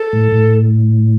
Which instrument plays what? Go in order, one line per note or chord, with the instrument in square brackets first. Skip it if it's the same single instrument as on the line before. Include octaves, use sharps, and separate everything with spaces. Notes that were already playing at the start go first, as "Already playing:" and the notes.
Already playing: [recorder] A4
[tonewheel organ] A2
A2